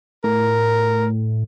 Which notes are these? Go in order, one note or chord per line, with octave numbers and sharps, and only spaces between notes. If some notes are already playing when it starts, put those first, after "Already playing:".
A2 A#4